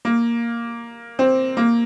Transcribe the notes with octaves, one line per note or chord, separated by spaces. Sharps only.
A#3
C4
A#3